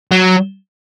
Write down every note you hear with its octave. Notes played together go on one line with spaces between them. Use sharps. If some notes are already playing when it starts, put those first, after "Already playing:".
F#3